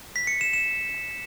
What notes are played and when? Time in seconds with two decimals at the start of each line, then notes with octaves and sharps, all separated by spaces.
0.16 B6
0.27 C#7
0.41 E7
0.53 E7